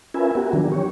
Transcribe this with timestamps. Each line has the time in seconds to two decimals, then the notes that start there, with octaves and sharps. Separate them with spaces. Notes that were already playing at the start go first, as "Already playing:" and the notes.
0.14 C#4 F4 A#4 B4 E5 G#5
0.35 B3 F#4 G4 A#4
0.53 D#3 F3 F#3 D4
0.72 G4 C#5